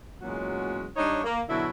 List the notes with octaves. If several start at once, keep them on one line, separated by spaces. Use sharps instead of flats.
E2 A#2 F#3 G#3 C#4 F#4
G3 D4 D#4 C#5
A#3
E2 B2 D3 F#3 E4